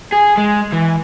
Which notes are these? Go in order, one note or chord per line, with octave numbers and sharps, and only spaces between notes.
G#4
G#3
E3